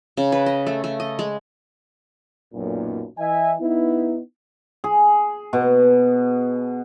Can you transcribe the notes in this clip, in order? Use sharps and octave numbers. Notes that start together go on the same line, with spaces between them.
C#3
B4
D#5
A3
A3
D#5
G#3
B1 F#2 A#2
E3 D#5 E5 G#5
B3 D#4 E4
G#4
B2